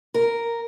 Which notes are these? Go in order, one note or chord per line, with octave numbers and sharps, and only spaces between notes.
A#4